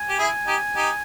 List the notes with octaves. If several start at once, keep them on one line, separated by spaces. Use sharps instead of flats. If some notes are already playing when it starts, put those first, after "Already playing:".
Already playing: G#5
G4
E4 G#4
D#4 G4
D#4 G4